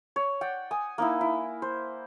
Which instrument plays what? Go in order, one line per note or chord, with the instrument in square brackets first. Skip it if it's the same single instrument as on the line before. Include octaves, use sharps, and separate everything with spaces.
[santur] C#5
D5 F#5 G5
G#5 D#6
A#3 D#4 E4
E4
C5